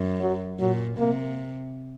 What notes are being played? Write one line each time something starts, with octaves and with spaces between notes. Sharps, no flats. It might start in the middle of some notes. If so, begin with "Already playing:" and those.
Already playing: F#2
F#3
A#2 F#3
C3 A#3